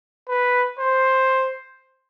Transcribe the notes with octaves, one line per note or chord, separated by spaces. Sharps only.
B4
C5